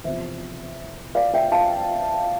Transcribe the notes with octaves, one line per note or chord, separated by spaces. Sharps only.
E2 C3 F3 C5 E5
D5 F5
E5 G5
F5 A5